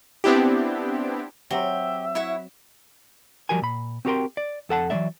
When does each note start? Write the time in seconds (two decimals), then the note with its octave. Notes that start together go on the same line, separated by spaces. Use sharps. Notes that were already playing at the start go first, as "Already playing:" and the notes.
0.24 B3 C4 D4 E4 G4
1.50 F#3 C4 G4 E5
2.15 E4 C#5 F#5
3.49 F3 G3 F#4 A#4 G#5
3.62 A#2 B5
4.05 C4 F#4 G4 A#4 G5 C6
4.37 D5
4.69 F2 A4 F#5 A5
4.90 E3 F#3 G#3 B3 D5 E5